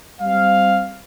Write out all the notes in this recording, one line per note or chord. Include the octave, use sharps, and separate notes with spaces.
G3 C4 F5